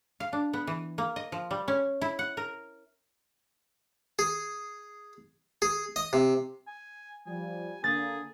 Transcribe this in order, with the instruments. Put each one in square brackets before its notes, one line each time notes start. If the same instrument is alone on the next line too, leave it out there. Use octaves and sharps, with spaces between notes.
[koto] F5
D4
B3
E3
A#3
D#5
F3
G3
C#4
E4
F#5
A#4
[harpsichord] G#4
G#4
D#5
C3
[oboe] G#5
[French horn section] F3 G3 [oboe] G#5
[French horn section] D3 A#3 [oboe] G#4 [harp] A6